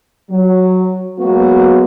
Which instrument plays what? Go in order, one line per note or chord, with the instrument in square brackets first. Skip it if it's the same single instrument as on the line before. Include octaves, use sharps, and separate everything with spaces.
[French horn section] F#3
F#3 G#3 A#3 B3 F#4